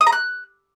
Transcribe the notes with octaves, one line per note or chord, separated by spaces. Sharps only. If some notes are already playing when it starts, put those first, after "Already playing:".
D#6
A#5
F#6